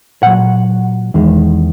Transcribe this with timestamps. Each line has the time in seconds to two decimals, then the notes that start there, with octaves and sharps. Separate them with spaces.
0.23 A#2 F#3 F#5
1.14 E2 D#3 G#3